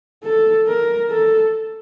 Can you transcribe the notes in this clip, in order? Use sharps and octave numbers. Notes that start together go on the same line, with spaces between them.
A4
A#4
A4